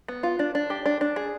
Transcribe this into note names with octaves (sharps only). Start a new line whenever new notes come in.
B3
F4
D4
D4
G4
D4
D4
G#4